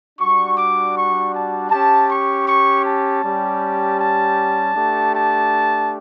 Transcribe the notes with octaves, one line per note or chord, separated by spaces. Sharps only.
G3 D4 F#4 C#6
D6
C#6
A5
C#4 G4 A5
C#6
C#6
A5
G3 C#4 G4
A5
A3 D4 G4
A5